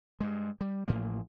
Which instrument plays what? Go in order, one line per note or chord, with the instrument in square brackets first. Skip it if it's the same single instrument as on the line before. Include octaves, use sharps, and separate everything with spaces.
[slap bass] G2 G#3
G3
A1 A2 F3 A#3